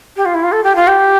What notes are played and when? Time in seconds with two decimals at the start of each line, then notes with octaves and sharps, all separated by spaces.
0.16 G4
0.25 F4
0.34 E4
0.43 F4
0.52 A4
0.64 G4
0.75 F4
0.87 G4